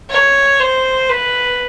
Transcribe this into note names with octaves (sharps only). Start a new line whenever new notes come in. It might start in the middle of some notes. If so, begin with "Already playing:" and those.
C#5
C5
B4